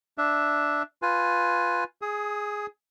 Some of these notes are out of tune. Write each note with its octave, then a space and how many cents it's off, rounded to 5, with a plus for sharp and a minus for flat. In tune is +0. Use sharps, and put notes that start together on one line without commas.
D4 +0 E5 +0
F4 +5 B4 +0 G#5 +0
G#4 +0 D#6 +30